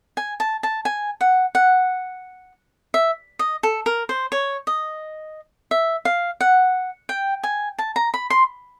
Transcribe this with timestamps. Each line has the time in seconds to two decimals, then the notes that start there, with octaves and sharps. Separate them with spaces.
0.17 G#5
0.40 A5
0.63 A5
0.85 G#5
1.21 F#5
1.55 F#5
2.94 E5
3.39 D#5
3.63 A4
3.86 A#4
4.09 C5
4.32 C#5
4.67 D#5
5.71 E5
6.05 F5
6.41 F#5
7.09 G5
7.43 G#5
7.79 A5
7.96 A#5
8.14 B5
8.30 C6